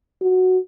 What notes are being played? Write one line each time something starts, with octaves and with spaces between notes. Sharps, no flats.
F#4